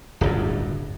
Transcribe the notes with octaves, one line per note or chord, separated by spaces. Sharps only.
D1 G1 F#2